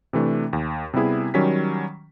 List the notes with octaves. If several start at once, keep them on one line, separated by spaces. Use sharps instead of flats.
C3 E3 A3 D4
D#2
C3 G3 B3 E4 G#4
D#3 F#3 G3 C#4 B6